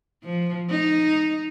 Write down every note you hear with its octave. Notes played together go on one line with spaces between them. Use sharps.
F3
D#4